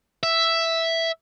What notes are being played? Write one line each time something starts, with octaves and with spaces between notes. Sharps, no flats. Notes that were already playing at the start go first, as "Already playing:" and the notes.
E5